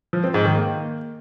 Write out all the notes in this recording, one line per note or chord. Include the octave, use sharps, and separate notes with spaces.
F3
C4
G#2
D#3
A#3